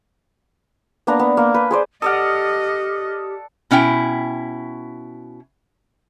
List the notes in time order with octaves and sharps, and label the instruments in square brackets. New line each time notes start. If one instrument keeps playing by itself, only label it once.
[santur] A#3 B3 D4 A#5
B3
A#3
B4
G#4 C5 D5
[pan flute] G4 [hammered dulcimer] A4 D5 F#5 [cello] D#5 [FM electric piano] D#6 F6
[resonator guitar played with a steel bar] B2 C#4 E4 G5